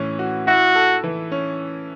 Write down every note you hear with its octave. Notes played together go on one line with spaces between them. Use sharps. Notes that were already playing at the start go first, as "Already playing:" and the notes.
Already playing: A2 E3 C#4
F#4
E4 F#4
A4
E3
C#4